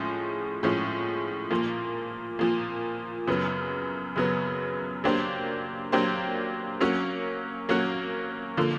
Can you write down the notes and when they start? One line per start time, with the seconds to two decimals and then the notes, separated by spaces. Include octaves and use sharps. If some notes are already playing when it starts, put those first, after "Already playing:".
Already playing: A2 F3 G#3 C#4
0.63 A2 F3 G#3 C#4
1.51 A#2 F3 A#3
2.39 A#2 F3 A#3
3.27 F#2 C#3 F#3 B3
4.16 F#2 C#3 F#3 B3
5.04 F#3 A#3 D4 G4 C5
5.92 F#3 A#3 D4 G4 C5
6.80 F#3 A#3 C#4 F#4
7.69 F#3 A#3 C#4 F#4
8.57 D3 F3 A#3